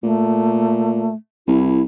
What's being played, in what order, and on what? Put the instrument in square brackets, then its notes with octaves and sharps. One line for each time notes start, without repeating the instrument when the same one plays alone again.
[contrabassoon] A#2 [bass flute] A3
[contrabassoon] C2 [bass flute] E4